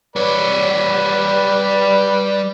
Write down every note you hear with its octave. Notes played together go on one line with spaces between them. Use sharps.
G3 B4 C#5 D5 B5